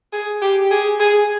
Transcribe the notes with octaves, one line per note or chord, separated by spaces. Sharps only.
G#4
G4
G#4
G#4